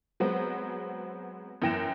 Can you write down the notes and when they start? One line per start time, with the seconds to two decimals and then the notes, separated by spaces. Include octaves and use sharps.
0.20 F#3 G#3 B3 C4
1.62 F#2 E3 G5 A#6 E7